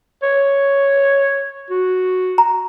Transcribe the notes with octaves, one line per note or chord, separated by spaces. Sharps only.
C#5
F#4
A#5